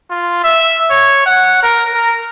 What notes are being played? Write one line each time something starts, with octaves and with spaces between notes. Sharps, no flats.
F4
E5
C#5
F#5
A#4
A#4